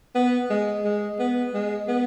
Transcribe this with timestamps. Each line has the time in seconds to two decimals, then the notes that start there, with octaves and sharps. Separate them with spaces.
0.15 B3
0.50 G#3
0.85 G#3
1.19 B3
1.54 G#3
1.88 B3